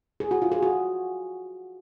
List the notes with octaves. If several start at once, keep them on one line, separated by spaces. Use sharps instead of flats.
G#4
F#4
F4
G#4
F#4